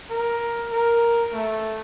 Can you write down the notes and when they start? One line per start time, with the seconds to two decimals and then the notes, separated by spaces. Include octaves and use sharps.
0.10 A#4
0.72 A#4
1.34 A3